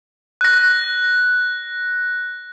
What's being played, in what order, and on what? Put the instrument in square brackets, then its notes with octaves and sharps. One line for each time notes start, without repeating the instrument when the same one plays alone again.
[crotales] F#6 A#6